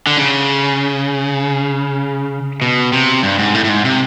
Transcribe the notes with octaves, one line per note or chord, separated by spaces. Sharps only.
D3
C#3
B2
C3
G2
G#2
A2
A2
G#2
C3